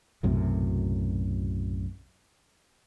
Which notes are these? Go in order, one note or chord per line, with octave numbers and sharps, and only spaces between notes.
B1 F#2 A2 C3